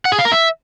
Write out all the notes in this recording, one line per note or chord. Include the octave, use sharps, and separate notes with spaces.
F#5
G#4
F5
A#4
E5